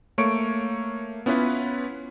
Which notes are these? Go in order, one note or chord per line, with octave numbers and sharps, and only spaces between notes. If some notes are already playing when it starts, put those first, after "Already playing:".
A3 A#3 C#5 C#6 D7
B3 C#4 E4 F4 B4